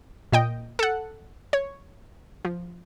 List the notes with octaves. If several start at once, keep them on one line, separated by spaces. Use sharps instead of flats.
A#2 D#5 G5
A4 F#5
C#5
F3